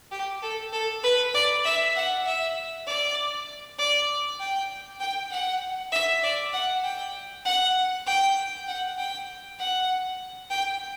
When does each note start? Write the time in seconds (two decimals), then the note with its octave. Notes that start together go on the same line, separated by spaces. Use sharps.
0.11 G4
0.42 A4
0.72 A4
1.04 B4
1.34 D5
1.64 E5
1.96 F#5
2.26 E5
2.87 D5
3.78 D5
4.40 G5
5.00 G5
5.31 F#5
5.92 E5
6.23 D5
6.53 F#5
6.84 G5
7.45 F#5
8.07 G5
8.68 F#5
8.98 G5
9.59 F#5
10.50 G5